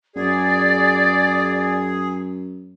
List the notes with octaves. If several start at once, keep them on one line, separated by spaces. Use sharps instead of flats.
F#2 G#4 D5